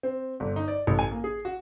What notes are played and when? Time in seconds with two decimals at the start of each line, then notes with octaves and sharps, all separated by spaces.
0.03 C4
0.40 G1
0.56 D#4
0.68 D5
0.87 A1
0.99 G#5
1.12 A#3
1.24 G#4
1.45 F#4